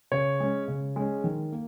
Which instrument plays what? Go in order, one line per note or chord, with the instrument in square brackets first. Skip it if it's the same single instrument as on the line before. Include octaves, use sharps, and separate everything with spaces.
[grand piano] C#3 C#5
G#3 C#4
C#3
G#3 C#4
D#3
A#3